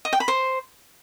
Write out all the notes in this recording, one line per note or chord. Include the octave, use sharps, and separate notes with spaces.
D#5
G5
B5
C5